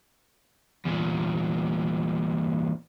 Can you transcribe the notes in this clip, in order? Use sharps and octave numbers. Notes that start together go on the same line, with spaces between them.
E2 A#2